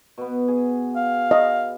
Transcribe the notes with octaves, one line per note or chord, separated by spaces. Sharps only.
B2 B3
G#4
F5
D#5